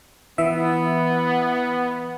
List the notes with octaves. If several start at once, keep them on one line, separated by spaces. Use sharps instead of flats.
E3 B3 E5